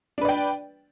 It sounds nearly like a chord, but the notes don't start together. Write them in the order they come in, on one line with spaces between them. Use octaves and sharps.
D4 B4 D5 G5